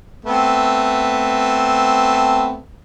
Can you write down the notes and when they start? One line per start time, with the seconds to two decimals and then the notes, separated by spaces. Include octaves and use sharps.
0.25 A3 B3 C4